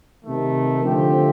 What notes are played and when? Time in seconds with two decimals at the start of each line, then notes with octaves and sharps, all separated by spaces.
0.23 C3 D#3 A3
0.82 D3 F3 A3 C4 G4